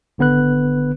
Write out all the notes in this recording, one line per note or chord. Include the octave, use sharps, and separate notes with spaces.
G#1 D3 B3 B4 F#6